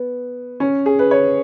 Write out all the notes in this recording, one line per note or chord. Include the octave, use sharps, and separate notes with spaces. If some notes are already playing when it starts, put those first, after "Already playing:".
Already playing: B3
C#4
G#4
B4
C#5